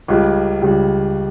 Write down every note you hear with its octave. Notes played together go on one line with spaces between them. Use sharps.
C#2 C#3 G3
C#2 C#3 G3